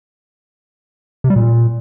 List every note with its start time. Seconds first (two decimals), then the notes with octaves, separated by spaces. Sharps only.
1.24 C3
1.30 G3
1.36 A#2